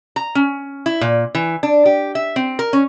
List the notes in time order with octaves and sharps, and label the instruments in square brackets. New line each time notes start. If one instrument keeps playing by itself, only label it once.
[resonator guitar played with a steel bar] A#5
C#4
E4
A#2
E3
D4
G4
E5
C4
A#4
C#4